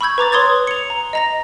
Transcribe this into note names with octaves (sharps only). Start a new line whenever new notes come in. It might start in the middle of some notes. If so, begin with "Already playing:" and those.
B5 C#6 E6 G6 G#6
B4 A#5 D6 A6
B4 C#5 C6 D#6 G#6 A6
C#7 F7
A#5
D#5 A#5 A#6